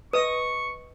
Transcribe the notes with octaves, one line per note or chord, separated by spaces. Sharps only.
B4 D#5 C#6 D#6